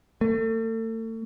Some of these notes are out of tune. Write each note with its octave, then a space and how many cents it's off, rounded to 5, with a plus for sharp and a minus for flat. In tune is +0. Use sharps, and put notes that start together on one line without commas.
A3 +35